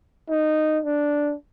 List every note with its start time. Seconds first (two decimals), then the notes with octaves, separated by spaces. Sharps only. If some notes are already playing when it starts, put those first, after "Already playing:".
0.29 D#4
0.85 D4